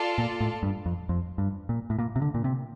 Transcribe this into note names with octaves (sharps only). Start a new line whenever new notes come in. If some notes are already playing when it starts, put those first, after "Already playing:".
Already playing: F4 A4 D5 A5
A#2
A2
G2
F2
F2
G2
A#2
A2
A#2
C3
D3
A#2
C3